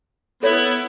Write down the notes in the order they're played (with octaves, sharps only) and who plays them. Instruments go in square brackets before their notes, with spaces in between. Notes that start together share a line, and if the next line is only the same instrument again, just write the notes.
[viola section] B3 E4 [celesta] A4 C#5